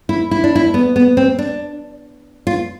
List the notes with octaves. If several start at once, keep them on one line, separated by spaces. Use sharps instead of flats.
E4
E4
D4
E4
B3
B3
C4
D4
F4